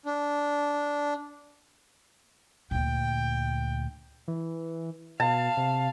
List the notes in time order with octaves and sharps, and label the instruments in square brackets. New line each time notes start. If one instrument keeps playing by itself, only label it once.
[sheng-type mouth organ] D4
[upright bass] D2 A#2 [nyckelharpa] G5
[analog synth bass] E3
[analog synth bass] B2 [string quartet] F5 [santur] A5
[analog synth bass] C3